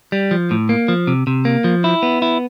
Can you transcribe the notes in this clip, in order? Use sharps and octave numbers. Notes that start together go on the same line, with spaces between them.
G3
F3
A2
A#3
F3
C3
C3
A#3
F3
E4
B3
E4